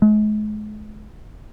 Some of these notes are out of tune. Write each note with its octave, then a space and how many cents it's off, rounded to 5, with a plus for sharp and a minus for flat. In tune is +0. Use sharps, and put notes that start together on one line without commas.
G#3 +40